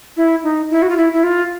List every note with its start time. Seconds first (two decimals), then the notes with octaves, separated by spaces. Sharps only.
0.17 E4
0.43 D#4
0.70 E4
0.82 F#4
0.90 F4
0.97 E4
1.13 E4
1.24 F4